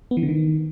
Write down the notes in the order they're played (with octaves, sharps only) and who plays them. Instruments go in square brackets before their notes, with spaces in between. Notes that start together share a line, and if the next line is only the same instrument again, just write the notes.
[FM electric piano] B3
E3
D3
D#3